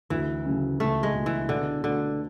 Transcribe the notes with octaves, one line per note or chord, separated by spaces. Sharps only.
D2 E3
C#3 F#3 C#4
C#2 A3
G#3
B2 A3 E4
E3
B2 D3
D3 A3 D4 F#4